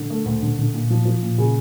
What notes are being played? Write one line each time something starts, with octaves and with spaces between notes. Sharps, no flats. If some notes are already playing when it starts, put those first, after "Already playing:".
Already playing: D3
A3
D2
D3
D3
A#2
F3
F3
A#2
C#3